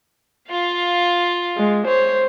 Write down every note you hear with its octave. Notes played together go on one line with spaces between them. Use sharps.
F4 F5
G#3
C5 C#5